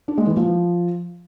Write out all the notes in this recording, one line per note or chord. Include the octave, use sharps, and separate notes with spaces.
D4
G#3
E3
F3